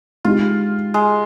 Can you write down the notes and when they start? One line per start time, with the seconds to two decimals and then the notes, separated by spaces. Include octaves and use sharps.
0.24 G#3 D#4 F4 G4
0.94 G#3